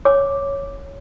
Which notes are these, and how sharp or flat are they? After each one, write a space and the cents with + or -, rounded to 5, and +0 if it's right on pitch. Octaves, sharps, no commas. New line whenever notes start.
C#5 +0 D6 +0